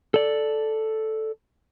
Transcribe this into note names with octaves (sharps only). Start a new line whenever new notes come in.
A4 D5